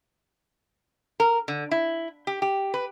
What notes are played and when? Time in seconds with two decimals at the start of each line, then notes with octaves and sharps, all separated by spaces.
1.20 A#4
1.48 D3
1.71 E4
2.27 G4
2.42 G4
2.74 B4